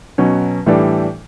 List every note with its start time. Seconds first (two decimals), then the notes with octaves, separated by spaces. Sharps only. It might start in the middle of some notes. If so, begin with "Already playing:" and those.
0.18 B2 F#3 C#4
0.66 A2 E3 G3 D4 A4